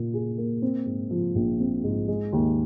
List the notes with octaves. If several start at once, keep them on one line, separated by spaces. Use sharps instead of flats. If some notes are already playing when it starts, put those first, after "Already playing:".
Already playing: A#2 A#3
G#4
A#3
C4
G#2
F3
A#1
C4
G#2
G#3
D#2